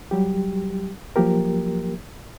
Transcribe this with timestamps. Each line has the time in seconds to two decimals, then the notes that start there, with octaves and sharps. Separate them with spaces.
0.11 F#3 G3 G4
1.16 F3 F#3 A#3 G4 A#4